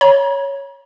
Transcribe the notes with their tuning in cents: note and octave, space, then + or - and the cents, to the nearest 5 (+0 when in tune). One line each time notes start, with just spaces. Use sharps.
C#5 +0 A#5 +45